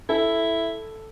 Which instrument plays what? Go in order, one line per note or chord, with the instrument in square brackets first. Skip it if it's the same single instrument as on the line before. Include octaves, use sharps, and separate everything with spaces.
[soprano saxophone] E4 [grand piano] A4